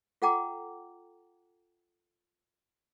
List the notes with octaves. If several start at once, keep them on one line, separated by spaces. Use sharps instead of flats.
F4 A4 F#5 G5 A#5 D6